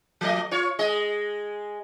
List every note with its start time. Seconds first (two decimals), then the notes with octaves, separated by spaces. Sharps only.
0.21 F3 A3 D#5
0.51 F4 C#5
0.79 G#3 D#5